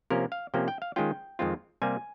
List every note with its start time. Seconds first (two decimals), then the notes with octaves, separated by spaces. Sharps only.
0.10 C3 F3 A#3 C#4 A#4
0.32 F5
0.54 C3 F3 A#3 C#4 G5
0.68 G5
0.82 F5
0.96 D#3 G#3 C#4 F4 G5
1.39 F2 D#3 G#3 C4 F4
1.82 C3 G3 A#3 G#5